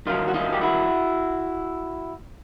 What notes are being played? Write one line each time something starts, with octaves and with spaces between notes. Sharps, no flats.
G2 D#3 F#3 D#4 F4
F#4
D#4 F4
G4
E4 F#4